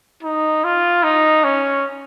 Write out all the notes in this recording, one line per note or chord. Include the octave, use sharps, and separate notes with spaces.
D#4
F4
D#4
C#4